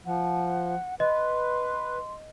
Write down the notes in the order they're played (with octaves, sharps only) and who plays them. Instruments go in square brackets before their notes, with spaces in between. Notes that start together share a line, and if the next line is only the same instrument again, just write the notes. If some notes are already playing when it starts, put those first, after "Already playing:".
[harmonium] F3 [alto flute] F#5
[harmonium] B4 [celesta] D#5 [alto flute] C6